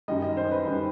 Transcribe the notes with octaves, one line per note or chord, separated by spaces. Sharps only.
F#2 D#3 G3 D#5
D#5
C5
B4
F#2 D#3 G3